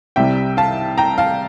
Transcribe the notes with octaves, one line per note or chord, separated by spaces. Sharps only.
C2 C3 G3 E5 G5
F5 A5
G5 A#5
F5 A5